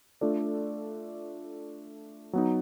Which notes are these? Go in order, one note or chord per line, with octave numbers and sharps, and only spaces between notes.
A3 D4 F4 A4 D5
F#3 B3 D#4